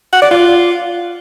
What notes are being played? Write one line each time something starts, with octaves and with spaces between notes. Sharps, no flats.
F#5
D5
F4